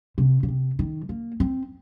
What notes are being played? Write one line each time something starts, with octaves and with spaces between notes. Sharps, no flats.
C3
C#3
C3
D#3
A#3
C4